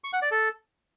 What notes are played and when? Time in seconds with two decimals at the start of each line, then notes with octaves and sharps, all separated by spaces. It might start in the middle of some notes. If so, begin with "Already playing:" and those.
0.04 C#6
0.13 F#5
0.22 D5
0.31 A4